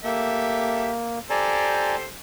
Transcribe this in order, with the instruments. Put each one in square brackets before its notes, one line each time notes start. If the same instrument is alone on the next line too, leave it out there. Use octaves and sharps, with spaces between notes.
[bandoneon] A#3 [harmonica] G4 A4 E5
[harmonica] G4 A4 C5 [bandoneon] D5 G#5 A#5